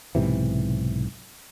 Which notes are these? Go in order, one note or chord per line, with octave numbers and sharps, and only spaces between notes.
B1 G#2 C3 E3